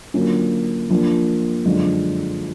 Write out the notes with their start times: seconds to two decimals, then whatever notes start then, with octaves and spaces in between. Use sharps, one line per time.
0.14 D3 F#3 A#3 C#4 F4
0.90 F3 A#3 D4
1.65 F#2 D3 F3 G#3